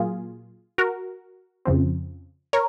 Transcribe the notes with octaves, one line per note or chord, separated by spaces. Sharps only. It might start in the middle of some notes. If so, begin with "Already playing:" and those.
Already playing: A#2 F#3 A#3 F4 G#4
F#4 A#4
F2 C#3 F3 C4
A#4 C#5